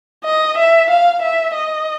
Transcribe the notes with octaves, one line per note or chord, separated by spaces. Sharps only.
D#5
E5
F5
E5
D#5